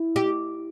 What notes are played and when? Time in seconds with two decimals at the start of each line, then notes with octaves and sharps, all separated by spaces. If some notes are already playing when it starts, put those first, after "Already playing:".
Already playing: E4
0.16 G4